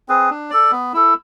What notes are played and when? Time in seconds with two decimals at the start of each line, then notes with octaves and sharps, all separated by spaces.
0.09 C4 G#4 B4
0.30 D4
0.50 A4 D5
0.72 B3
0.93 E4 A4